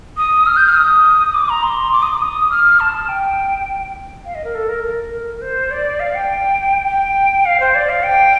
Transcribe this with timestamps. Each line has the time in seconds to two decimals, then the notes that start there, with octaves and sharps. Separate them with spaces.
0.17 D#6
0.46 F6
0.57 G6
0.67 F6
0.76 D#6
1.34 D6
1.49 A#5
1.63 C6
1.92 D6
2.02 D#6
2.07 D6
2.21 D#6
2.51 F6
2.80 A5
2.94 A5
3.09 G5
4.25 F5
4.35 D#5
4.44 A#4
4.55 A4
4.69 A#4
4.84 A#4
5.13 A#4
5.41 C5
5.71 D5
6.00 F5
6.15 G5
6.87 G5
7.45 F5
7.60 C5
7.75 D5
7.89 F5
8.03 G5